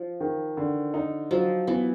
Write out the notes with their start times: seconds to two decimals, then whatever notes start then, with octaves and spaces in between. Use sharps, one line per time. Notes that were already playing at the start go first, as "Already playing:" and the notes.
Already playing: F3
0.21 D#3
0.57 D3
0.94 D#4
1.31 F3 F#3
1.67 E3 B3